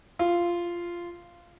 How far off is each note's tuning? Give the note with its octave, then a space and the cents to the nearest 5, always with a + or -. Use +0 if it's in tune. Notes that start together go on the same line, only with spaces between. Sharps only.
F4 -10